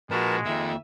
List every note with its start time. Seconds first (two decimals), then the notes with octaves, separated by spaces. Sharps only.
0.11 A#2 F3 G#3 F#4 A#4 B4 A5
0.46 F2 D#3 A#3 E5